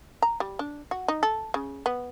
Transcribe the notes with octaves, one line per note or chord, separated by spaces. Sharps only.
A#5
G3
D4
F#4
D#4
A4
C#3
B3